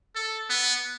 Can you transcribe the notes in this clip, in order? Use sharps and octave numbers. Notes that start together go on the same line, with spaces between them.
A4
B3